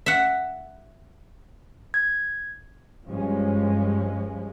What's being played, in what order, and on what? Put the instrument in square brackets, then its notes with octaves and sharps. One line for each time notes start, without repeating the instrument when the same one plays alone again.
[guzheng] E5 F#5
[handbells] G#6
[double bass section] G2 F3 G#3 C#4